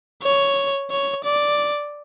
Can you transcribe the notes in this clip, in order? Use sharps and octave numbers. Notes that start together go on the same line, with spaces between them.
C#5
C#5
D5